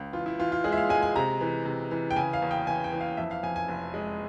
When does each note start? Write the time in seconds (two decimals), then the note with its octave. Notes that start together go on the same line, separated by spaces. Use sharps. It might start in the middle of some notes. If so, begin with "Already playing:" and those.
Already playing: C#2
0.13 E3 F4
0.26 E4
0.39 E3 F4
0.52 F4
0.64 G#3 G#4
0.72 E5
0.77 F5
0.89 G#3 G#5
1.02 G#5
1.16 C3 A#5
1.41 E3
1.65 C3
1.91 E3
2.11 G5
2.16 C#3 G#5
2.33 F5
2.42 E2
2.51 G5
2.67 E2 G#5
2.84 G5
2.93 E3
3.01 F5
3.17 F2 E5
3.31 F5
3.43 F2 G#5
3.56 G#5
3.68 F1
3.94 G#3